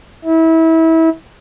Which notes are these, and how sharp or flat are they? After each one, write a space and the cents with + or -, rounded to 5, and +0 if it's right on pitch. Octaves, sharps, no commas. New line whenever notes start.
E4 -25